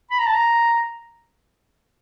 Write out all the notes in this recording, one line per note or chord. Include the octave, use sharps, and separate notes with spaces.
B5
A#5
A5
A#5